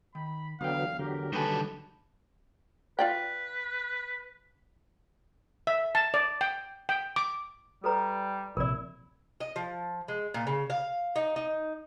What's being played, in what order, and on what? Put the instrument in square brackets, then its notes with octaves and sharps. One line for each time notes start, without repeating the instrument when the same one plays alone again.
[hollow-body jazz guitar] D#3 [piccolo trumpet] B5
[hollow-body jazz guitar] E2 G5 [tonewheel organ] D3 F#3 B3 [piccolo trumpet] F5
[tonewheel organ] D3 F#3 G4 [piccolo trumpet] A#4
[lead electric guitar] D#3 A4 [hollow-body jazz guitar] G3 A#3 G#5 [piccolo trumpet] B4
[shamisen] F4 D5 G5 [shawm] B4
[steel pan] E5
A5
D5
G5
G5
D6
[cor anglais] G3 [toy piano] A4 B4 A#5
[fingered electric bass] A#1 C3 [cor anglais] E4 [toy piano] A#4 D5
[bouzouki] D#5
F3
G#3
A#2
C#3
F5
D#4
D#4